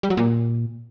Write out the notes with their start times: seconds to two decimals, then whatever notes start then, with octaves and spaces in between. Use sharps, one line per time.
0.03 G3
0.10 F#3
0.17 A#2